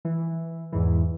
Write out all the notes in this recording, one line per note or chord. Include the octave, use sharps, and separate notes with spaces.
E3
E2 G#2 E3